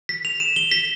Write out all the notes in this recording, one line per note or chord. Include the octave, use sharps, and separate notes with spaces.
B6
F7
E7
G7
B6